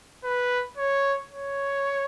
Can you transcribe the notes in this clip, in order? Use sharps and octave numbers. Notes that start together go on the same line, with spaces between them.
B4
C#5
C#5